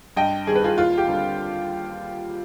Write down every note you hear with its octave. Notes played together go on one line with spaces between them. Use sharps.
G2 D#5 G5
D#3 G3 C4 G#4
B4
F4 G#4
D#2 F4
G4
D3 G3 C4